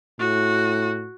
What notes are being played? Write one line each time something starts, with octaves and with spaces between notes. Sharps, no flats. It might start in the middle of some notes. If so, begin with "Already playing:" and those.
A2 F#4